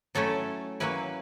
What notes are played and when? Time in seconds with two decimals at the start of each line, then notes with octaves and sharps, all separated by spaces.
0.15 F#3 A3 C#4 E4 A4
0.80 F#3 A#3 C#4 E4 B4